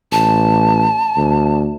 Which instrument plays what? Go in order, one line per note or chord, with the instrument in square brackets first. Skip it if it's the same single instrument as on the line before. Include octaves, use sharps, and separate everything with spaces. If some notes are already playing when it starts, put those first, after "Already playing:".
[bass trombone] A1 [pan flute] A5
[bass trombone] D2